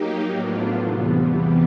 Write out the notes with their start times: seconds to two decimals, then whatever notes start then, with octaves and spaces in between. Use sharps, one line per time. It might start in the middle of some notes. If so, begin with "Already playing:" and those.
Already playing: F#3 A#3 D#4 G4
0.27 A2 F#3 B3 D4 F4
0.80 E2 C3 E3 G3 B3